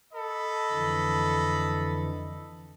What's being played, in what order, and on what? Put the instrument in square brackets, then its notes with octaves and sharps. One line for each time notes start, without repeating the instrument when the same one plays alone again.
[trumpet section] A4 D#5 B5
[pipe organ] F2 D3 E3